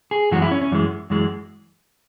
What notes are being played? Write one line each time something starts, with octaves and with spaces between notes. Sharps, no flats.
G#4
F#2 E3 G#3 F#4
E4
C#4
C#4
F#2 E3 G#3
F#2 E3 G#3